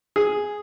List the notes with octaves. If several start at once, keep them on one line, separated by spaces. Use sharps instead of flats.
G#4